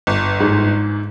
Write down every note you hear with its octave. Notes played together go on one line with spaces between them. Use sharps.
G1
G#2